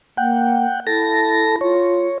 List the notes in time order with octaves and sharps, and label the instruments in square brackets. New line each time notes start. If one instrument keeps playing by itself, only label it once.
[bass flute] A#3 [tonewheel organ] F#5 G5
[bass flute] E4 [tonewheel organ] A4 A5 A#6
[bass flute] F4 [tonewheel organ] C#5